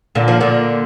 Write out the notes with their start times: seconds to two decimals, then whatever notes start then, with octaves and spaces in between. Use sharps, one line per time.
0.15 A#2 D3
0.28 F3
0.41 A#2 D3